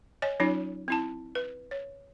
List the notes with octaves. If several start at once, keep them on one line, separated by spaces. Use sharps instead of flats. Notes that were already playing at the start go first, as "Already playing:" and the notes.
C#5 D#5 G#5
F#3 C#4 D#4 F4 C#5
C4 E4 A5
B4
C#5